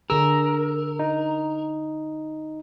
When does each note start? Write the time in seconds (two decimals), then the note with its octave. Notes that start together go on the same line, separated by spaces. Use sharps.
0.10 D3 G#4 A#4 E6
0.99 D#4